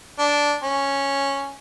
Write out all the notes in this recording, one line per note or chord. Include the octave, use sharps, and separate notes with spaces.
D4
C#4